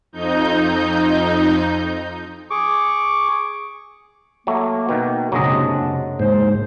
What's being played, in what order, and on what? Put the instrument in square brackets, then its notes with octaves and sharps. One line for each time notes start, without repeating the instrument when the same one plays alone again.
[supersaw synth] F2 D#4 G6
[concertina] G#4 C#6 D6
[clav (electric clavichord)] F#3 A3 [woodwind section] A#3
[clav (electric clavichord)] B2 D#3
[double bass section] F#1 C3 [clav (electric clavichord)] F#3 G#3 D#5 [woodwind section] D4
[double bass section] F#1
[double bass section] D#2 [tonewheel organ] G#2 [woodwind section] C5